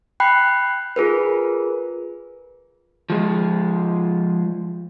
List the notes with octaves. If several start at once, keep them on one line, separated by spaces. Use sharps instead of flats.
G5 B5 F#6 C7
F4 G#4 A#4 B4
F3 G#3